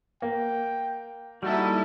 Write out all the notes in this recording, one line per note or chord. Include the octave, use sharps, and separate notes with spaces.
A#3 G5
G3 A#3 D#4 E4 F#4 A4